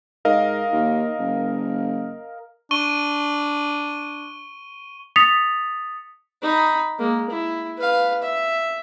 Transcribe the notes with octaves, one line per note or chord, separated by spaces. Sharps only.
G#2 A#4 D#5 F5
D#2
F#1
D4 C#6 D#7 G7
D#6 A6 B6 C#7 F7
D#4 B5
G#3 A#3
E4
B4 F5
E5